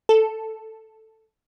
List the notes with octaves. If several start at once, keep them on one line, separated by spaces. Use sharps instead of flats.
A4